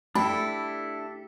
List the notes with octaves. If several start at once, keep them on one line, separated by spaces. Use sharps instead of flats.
A3 D4 E4 G4 A4 B5